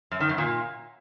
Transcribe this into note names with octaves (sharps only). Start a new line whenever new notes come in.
F#2
D#3
F#2
A#2